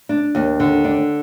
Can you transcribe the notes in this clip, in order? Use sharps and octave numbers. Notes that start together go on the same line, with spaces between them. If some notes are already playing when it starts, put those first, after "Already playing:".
D4
D#2
D3
D4